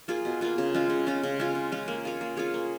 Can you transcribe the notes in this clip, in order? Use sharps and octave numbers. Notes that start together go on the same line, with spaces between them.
A#3 F4 G#4
B2
A#3 F4 G#4
C#3
G#3 C#4 F4
C#3
G#3 C#4 F4
C#3
G#3 C#4 F4
C#3
G#3 C#4 F4
A#3
F4 G#4 C#5
A#3
F4 G#4 C#5
A#3